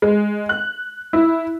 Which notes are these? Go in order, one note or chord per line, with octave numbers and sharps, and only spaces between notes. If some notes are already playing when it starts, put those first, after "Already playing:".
G#3
F#6
E4